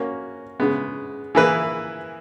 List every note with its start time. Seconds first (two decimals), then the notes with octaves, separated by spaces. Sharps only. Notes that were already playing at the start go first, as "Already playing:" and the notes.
Already playing: A#3 C#4 F#4
0.60 C#3 G#3 B3
1.35 E3 A#3 E4 G#4 B4